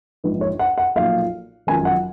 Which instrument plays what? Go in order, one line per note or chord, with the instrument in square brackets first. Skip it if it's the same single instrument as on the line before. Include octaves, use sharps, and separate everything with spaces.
[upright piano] A#1 G#2 F3 B4
C#5
F#5
F#5
B1 A#2 F3 F5
G#1 F#2 F3 G#5
F#5